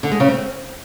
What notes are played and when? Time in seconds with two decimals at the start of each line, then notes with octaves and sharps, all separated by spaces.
0.03 D3
0.12 G#3
0.20 C#3
0.28 C4